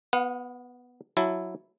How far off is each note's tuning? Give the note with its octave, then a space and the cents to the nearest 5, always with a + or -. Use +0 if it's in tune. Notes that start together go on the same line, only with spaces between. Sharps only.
B3 +0 F#5 -45
F#3 -5 E4 +0 A5 -20